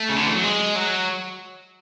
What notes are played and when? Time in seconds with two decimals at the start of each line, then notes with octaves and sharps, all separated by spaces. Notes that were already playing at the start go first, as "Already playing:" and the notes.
Already playing: A3
0.09 C#3
0.16 D3
0.26 E3
0.35 F#3
0.44 G#3
0.75 F#3